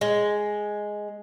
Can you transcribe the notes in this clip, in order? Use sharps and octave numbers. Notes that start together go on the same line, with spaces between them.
G#3